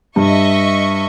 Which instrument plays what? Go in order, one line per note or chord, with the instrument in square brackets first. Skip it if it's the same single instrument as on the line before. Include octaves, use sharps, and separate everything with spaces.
[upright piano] G2 [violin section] D#5 E5 C#6